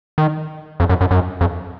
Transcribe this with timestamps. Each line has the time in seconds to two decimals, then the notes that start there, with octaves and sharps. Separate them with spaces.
0.18 D#3
0.80 F2
0.89 F#2
1.01 F#2
1.11 F#2
1.41 F2